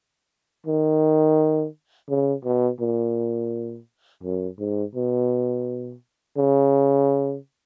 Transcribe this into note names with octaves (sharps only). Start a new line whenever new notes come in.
D#3
C#3
B2
A#2
F#2
G#2
B2
C#3